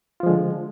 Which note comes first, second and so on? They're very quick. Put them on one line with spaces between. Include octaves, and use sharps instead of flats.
F4 F3 G#3 D3